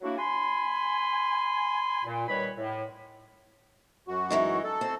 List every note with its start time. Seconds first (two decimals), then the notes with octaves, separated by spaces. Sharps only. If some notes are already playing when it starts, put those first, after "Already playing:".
0.01 F#3 A3 A#3 D4 E4 F#4
0.18 G#5 B5 C6
2.05 A#2
2.26 D#2 D#3 G3 B4 C#5 B5
2.57 A2
4.08 F#2 F#4
4.30 E3 G#3 D#4
4.64 A4
4.81 C4